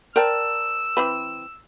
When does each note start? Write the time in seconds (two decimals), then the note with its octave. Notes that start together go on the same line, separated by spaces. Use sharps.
0.16 A#4 C5 D5 G5 A5 E6
0.97 E3 C4 B4